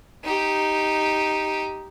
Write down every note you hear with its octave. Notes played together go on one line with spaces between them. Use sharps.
D#4 G4